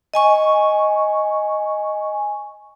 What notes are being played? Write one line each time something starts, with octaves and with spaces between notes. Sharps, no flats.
D#5 G#5 C#6